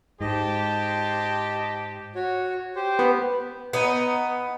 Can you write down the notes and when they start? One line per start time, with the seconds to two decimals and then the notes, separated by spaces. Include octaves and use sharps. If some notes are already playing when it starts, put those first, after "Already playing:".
0.21 G#2 G4 C5 D#5 A5
2.15 F#4 C#5
2.76 G4 C5
2.99 B3
3.73 B3 D#4